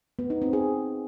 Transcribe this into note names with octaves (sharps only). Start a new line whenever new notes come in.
B3
D#4
C4
G#4